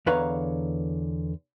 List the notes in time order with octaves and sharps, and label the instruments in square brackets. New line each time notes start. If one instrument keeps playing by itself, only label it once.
[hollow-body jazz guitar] E2 D3 B4 C#5 F5 A#5